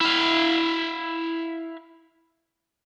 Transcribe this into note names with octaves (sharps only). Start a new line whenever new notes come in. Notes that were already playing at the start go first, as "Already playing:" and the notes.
E4 F5